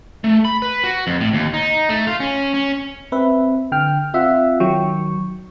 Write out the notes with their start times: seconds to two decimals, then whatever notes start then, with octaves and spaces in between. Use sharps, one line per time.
0.24 A3
0.45 B5
0.62 B4
0.84 F#4
1.07 F2
1.21 A2
1.33 D#2
1.54 D#4
1.89 A3
2.07 F4
2.20 C#4
2.54 C#4
3.12 C4 B4 E5
3.72 D3 G5 F6
4.14 C4 F4 E5 F#5
4.60 D#3 F#3 G5 C#6